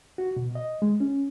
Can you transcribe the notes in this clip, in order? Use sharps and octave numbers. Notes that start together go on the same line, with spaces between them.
F#4
B2
D#5
G#3
C#4